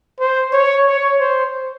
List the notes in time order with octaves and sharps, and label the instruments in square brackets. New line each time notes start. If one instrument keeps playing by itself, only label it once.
[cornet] C5
C#5
C#5
C5